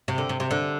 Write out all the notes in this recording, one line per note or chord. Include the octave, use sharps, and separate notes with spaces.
C3
D3
C3
C3
D3